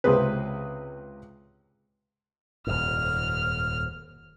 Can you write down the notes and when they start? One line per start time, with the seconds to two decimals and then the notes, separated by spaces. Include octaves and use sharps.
0.04 C#2 C3 C4 G#4 B4
2.67 D#1 F2 G#2 F6